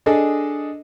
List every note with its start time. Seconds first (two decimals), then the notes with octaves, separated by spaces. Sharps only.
0.06 D4 G#4 A4 D#5